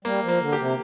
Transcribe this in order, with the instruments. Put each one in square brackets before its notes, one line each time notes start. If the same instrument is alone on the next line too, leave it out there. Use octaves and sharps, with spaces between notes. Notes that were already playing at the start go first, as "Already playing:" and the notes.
[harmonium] G3 [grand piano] A#3
[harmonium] F3
[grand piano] A#3
[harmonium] D3
[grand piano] G4
[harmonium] C3